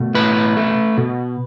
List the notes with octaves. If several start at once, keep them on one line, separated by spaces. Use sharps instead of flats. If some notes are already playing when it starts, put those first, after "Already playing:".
Already playing: B2 A3
A2 B4
A3
B2